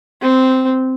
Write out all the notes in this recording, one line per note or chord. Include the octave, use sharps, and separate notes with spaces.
C4